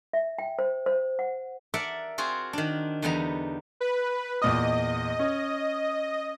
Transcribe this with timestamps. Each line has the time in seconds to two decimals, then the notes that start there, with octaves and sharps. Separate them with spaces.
0.13 E5
0.39 G5
0.59 C5
0.86 C5
1.19 F#5
1.74 A#4 D5 E5 F#5 A5
2.18 C4 F4 F#4 G#4
2.53 D#3 D4
3.02 E2 D3 G3 B3 D#4 A#5
3.81 B4
4.42 E2 A#2 D#5 D#6
5.19 C#4